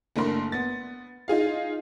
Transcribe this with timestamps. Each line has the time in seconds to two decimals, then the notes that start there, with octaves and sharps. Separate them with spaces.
0.16 F#1 A3 D4 A#4 C6
0.52 B3 A6
1.28 D#4 F4 G#4 F5